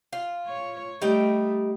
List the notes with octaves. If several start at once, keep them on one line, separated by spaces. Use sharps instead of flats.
F4
C#5
G3 A3 D#4 G5